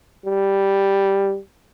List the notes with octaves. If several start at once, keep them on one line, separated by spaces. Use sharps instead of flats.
G3